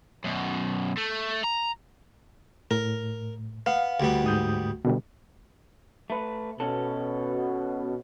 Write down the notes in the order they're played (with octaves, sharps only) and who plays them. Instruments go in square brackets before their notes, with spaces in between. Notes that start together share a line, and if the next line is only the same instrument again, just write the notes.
[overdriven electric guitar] F#2 B2
A3
A#5
[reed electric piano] A2 [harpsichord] A#4
[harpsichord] B3 [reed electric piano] F5
[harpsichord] D2 G3 B3
[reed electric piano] G#2 D#6 G6
B2 D3 G3
[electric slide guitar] A3 B4
[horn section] B2 [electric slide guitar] C#4 A4